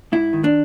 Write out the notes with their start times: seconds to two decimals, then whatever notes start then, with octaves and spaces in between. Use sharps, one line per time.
0.12 G#2 E4
0.33 D#3
0.44 D4